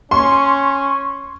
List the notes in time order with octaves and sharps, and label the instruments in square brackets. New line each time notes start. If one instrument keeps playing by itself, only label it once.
[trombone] C#4 [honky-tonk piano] C6 [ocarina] C#6